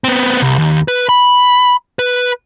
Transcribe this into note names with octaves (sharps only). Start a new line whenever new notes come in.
B3 C4
C2
D#2
B4
B5
B4